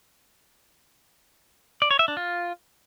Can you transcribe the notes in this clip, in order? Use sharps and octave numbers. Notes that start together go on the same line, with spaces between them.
D5
C#5
E5
D4
F4